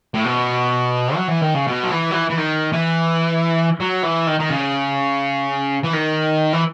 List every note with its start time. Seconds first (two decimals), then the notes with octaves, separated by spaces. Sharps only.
0.14 A2
0.25 B2
1.16 F#3
1.28 E3
1.42 D#3
1.54 C#3
1.67 B2
1.83 F#3
1.91 E3
2.11 F#3
2.14 E3
2.30 E3
2.38 D#3
2.73 E3
3.80 F#3
4.03 E3
4.27 D#3
4.40 D#3
4.51 C#3
5.84 E3
5.93 D#3
6.53 E3